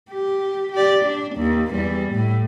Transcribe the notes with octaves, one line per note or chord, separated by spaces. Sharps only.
G4
G4 D5
D4
D#2
E2 G3
A2